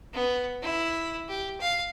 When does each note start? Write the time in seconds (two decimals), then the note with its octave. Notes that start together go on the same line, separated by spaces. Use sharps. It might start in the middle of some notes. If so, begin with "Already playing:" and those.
0.13 B3
0.62 E4
1.28 G4
1.60 F5